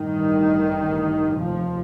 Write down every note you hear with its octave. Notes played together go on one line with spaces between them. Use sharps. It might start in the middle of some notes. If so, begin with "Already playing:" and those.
Already playing: A1 G2 D#3
F1 D#2 F3